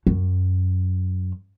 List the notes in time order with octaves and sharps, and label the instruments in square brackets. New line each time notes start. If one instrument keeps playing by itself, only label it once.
[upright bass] F#2